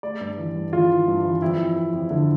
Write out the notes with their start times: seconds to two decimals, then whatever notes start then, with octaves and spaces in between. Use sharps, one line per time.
0.03 A3 D5
0.21 G2
0.38 E3
0.55 G2
0.72 E3 F4
0.90 E3
1.08 G2
1.25 E3
1.42 F2 E4
1.59 F2
1.76 F2
1.93 F2
2.10 D3 E4